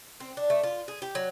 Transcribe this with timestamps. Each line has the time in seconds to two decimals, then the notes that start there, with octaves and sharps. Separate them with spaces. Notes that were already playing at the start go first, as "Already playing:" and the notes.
0.20 C4
0.37 D4
0.50 A3
0.63 F4
0.88 G#4
1.02 G4
1.15 F#3